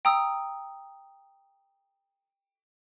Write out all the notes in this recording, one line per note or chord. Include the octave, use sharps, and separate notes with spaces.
G5 A#5 D#6 E6